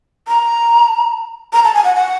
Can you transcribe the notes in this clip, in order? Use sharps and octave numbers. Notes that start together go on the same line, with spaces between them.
A#5
A#5
A5
G#5
F#5
F#5